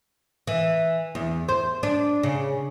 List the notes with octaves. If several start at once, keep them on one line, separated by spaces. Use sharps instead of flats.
E3
E2
C5
D4
C#3